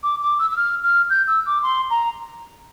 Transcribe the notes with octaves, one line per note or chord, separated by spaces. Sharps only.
D6
D6
E6
E6
F6
F6
G6
E6
D6
C6
A#5